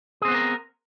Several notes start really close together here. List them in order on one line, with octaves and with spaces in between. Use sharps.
G#4 C4 B3 C5 A#4